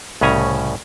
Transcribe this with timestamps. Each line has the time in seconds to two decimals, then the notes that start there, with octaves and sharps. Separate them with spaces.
0.21 C2 A2 C#3 C#4 G#5 A#5